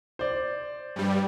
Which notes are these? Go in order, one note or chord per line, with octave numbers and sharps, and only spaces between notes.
C5 D5
G2 G3